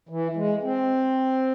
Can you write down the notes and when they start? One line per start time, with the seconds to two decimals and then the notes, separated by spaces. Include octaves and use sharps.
0.09 E3
0.36 G#3
0.62 C4